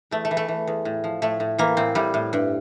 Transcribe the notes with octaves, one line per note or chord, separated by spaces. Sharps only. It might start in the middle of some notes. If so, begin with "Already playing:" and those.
E2 A3
A3
E3
A3
E3
E2
A2
F3
A2 A3
A2
E3 A#3
A2 C4
A2 G3
A2
G2